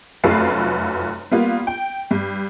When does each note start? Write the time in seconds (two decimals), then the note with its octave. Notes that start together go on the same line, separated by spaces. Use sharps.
0.24 F1 F#2 A3 F4 B4 C7
1.31 G3 A#3 B3 F4
1.67 G5
2.11 G2